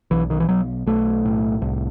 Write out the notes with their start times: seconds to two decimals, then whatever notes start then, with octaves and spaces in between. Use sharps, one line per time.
0.11 B1 E3
0.30 D#3
0.40 E3
0.49 B1 F#3
0.86 B1 A3
1.25 A2
1.62 C2